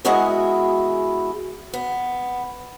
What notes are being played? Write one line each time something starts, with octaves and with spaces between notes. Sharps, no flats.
G#3 B3 E4 F#4 G#4 A#4
B3